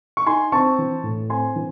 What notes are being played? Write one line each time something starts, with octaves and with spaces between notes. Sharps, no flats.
C#6
D#4 G#5 C6
C4 A5 C#6
E3
A2
C4 G#5 C6
E3